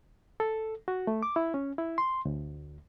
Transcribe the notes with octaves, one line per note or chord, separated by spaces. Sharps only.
A4
F#4
A3
D6
E4
C#4
E4
C6
D2